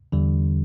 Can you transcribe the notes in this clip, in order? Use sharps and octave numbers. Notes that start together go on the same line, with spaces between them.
E2 D3 G3